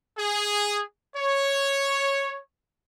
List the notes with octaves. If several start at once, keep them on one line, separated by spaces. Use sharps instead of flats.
G#4
C#5